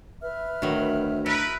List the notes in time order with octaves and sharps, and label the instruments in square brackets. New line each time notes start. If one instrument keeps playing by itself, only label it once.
[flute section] B4 E5 F6
[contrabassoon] D2 [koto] D#3 F#3
[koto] E4 [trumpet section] A#4 B4